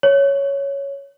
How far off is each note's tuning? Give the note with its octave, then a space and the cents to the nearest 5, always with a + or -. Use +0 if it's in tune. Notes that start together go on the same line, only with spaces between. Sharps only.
C#5 +5